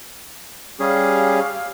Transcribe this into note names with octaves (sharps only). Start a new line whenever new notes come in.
G3 C#4 G4 G#4 F5